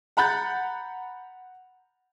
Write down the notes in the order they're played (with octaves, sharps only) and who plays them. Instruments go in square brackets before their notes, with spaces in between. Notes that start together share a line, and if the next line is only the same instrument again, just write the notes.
[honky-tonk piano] F#5 A#5 B5 F#6 G6 A6